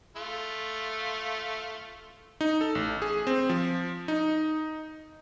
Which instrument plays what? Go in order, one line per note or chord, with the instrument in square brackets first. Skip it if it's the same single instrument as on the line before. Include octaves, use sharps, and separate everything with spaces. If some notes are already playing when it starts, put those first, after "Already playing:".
[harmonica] A3 F4
[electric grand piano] D#4
A4
A1
G#4
C4
F3
D#4